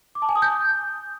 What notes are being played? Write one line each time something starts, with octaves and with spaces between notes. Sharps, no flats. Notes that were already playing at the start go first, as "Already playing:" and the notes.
D6
A5
G#5
D#6
G6